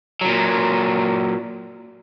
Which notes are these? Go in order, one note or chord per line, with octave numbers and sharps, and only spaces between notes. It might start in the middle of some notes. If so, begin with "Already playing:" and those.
A#2 F#3